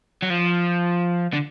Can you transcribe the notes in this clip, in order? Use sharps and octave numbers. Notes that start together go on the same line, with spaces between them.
F#3
F3
D3